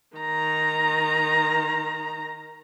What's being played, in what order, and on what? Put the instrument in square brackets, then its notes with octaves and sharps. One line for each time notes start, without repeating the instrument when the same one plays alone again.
[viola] D#3 A#5